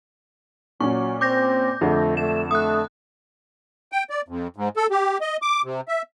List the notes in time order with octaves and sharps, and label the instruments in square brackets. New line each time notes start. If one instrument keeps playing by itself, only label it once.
[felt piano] A#2 C#4 [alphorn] F#3 [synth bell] C#6
[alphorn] C4 [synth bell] D6 G6 A#6
[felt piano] F2 D3 [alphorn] A3
[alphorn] A3 [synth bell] E7
[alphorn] A3 [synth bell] D#6 F#6
[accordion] G5
D5
F2
G#2
A4
G4
D#5
D6
C3
E5